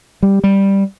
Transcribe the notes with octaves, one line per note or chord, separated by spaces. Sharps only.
G3
G3